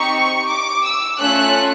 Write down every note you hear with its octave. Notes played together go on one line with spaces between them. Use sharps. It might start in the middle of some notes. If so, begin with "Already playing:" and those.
Already playing: C4 D#4 G4 C#6
D6
E6
A3 C#4 F4 A4 F#6